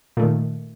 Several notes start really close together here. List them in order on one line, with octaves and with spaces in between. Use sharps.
A#2 A3 D#3